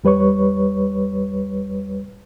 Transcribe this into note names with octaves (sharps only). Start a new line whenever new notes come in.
E2 G3 B4 C#5 C#6